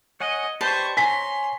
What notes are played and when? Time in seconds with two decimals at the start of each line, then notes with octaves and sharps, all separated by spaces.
0.20 C#5 D#5 F#5 G#5
0.61 G4 B4 C5 D5 A5 C#6
0.97 C#5 G#5 A#5 C6 B6